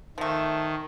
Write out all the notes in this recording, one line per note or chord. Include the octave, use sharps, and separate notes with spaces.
D#3 F3 A3